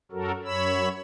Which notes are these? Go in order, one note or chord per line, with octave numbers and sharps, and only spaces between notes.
F#2 F#3 F#4 A4 A#4
F#2 C#5 B5 E6